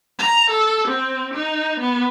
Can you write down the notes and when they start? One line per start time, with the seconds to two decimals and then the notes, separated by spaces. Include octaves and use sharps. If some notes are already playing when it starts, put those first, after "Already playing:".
0.19 A#5
0.50 A4
0.88 C4
1.34 D#4
1.80 B3